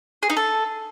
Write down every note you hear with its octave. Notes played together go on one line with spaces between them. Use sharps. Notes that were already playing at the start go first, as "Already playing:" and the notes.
G#4
D#4
A4